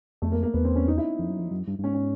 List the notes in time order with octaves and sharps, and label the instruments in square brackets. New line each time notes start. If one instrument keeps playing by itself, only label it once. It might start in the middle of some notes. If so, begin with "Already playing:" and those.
[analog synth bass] F2 [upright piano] A3
[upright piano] A#3
A#3
[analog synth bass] E2 [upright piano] B3
[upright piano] C4
C#4
D#4
E4
[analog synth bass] F2
F#2
F2
F#2
G2
G2
[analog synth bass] G#2 [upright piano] C#4
[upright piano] C#4